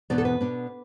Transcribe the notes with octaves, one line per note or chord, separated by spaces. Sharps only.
E2 B2 B3 D4 D5
A4
B4
B2 B3 D4